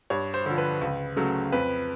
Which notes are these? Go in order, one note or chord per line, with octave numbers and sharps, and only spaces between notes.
G2 C#5
C5
D3 F3
B4
C#2
C#3 F#3 A3
F2 B4